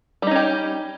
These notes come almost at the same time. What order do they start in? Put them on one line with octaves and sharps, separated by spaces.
G3 D#4 C#4 G4